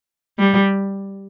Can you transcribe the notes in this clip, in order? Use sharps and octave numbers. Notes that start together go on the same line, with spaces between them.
G3